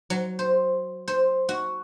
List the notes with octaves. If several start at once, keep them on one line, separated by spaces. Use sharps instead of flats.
F#3
C5
C5
F#4